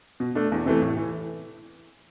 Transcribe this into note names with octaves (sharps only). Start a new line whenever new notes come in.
B2
A3 D4
E2
C3 E3 A3
A2
E3